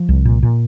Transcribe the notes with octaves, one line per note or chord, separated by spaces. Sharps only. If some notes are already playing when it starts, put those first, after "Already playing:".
Already playing: F3
C2
A#2
A#2